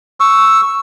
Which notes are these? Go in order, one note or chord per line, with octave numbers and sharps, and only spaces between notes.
C#6 E6